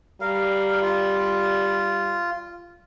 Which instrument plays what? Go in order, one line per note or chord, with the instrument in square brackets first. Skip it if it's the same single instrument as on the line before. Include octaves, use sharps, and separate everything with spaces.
[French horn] G3 [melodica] A#4 F5
[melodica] F4